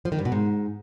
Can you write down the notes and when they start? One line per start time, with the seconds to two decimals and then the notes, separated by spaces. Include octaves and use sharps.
0.05 F3
0.12 D#3
0.19 G2
0.25 B2
0.32 G#2